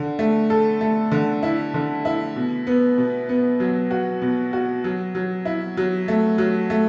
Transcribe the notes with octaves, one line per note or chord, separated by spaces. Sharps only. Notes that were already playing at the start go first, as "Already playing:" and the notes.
Already playing: D3
A3
A4
A3
D3
E4
D3
E4
B2
B3
B2
B3
F#3
F#4
B2
F#4
F#3
F#3
E4
F#3
A3
F#3
A3